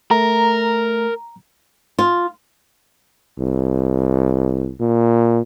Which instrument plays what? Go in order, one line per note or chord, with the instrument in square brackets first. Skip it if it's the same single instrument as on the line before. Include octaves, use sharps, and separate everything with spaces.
[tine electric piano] A3 [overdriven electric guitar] A#4 [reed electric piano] A#5
[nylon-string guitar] F4
[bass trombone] C2
A#2